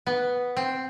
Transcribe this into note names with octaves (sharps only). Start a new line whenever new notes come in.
B3
C4